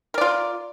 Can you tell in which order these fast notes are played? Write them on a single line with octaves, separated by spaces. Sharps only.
A#4 D5 F4